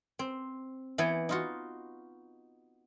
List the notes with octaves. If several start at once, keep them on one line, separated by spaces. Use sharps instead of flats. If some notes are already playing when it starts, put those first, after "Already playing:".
C4
E3 B3 E4 C#5 G5 G#5
D#4 F4 F#4